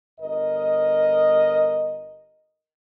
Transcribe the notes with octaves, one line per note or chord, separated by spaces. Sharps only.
G1 A#4 D#5